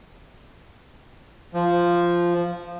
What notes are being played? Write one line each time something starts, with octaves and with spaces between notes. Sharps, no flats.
F3